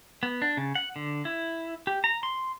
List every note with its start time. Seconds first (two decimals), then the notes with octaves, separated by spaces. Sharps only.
0.23 B3
0.42 D4
0.57 C#3
0.75 F#5
0.96 D3
1.25 E4
1.87 G4
2.04 A#5
2.23 C6